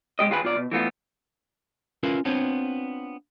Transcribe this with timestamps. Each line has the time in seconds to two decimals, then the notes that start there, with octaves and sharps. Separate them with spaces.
0.19 C2 G#3 G4 D#5
0.31 D#2 F4 G4 G#4 B4 B5
0.43 B1 F4 D5
0.56 B2
0.71 E3 A3 B3 F4
2.03 C#4 E4 F4 A#4 B4 F5
2.25 B3 C4 D4 F4 C5 C#5